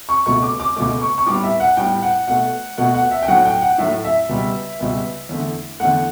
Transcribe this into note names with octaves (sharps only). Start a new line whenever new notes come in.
C#6
C#2 B2 A3 C#6
D6
D6
C#2 B2 A3 D6
C#6
C#6
A2 G3 B3 D6
E5
F#5
A2 G3 B3 G5
F#5
B2 A3 F#5
B2 A3 F#5
F#5
E5
G5
A2 F#3 A3 F#5
G5
F#5
A2 F#3 A3 E5
E5
C#2 B2 G3 B3
C#2 B2 G3 B3
E2 D3 A3
E2 D3 A3 F#5